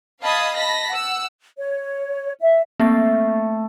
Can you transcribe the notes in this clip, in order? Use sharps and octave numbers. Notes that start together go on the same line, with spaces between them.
D#5 F5 A5 B5 D#6 G#6
D#5 A5 B5 A#6 B6
F#5 E6
C#5
E5
A3 A#3 C4 A6